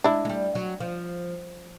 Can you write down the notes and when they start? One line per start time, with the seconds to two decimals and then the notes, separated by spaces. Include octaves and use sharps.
0.04 G#3 D4 E4
0.25 G#3
0.29 G3
0.55 F#3
0.80 F3